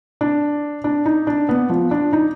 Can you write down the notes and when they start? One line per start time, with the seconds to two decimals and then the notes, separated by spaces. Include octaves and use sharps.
0.21 D4
0.84 D4
1.06 D#4
1.27 D4
1.49 B3
1.70 F3
1.91 D4
2.13 D#4